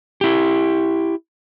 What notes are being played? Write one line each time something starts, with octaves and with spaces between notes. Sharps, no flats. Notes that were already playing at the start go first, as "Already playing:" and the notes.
E4 G4